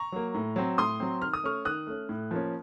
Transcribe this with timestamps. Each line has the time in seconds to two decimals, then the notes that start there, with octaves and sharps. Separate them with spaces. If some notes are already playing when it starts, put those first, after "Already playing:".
Already playing: A#5 C#6
0.12 F#3 A#3
0.34 A2
0.56 F#3 C4
0.78 A2 C6 D#6
1.00 F#3 C4
1.22 D#3 F6
1.33 D#6
1.44 A3 C#4 C#6 F6
1.65 D#3 D#6 F#6
1.87 A3 C#4
2.09 A2
2.31 F3 A#3 C#4